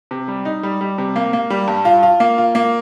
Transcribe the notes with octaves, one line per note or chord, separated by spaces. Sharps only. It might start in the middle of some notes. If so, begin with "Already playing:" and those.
C3
G3
D#4
G3
G3
C3
A#3
A#3
G3
G2
F4
F4
A#3
F4
A#3